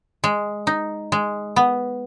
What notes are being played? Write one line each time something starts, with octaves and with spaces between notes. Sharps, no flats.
G#3
D#4
G#3
B3